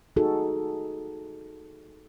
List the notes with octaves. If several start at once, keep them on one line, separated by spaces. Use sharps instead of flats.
D#4 F#4 G#4 A4